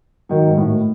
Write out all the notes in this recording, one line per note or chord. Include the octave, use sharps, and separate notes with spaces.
D#3 F#3
G#2
A2